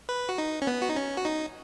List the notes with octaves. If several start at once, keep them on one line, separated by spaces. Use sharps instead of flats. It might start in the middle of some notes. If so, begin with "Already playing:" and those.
B4
F#4
D#4
C#4
B3
F#4
D#4
C#4
F#4
D#4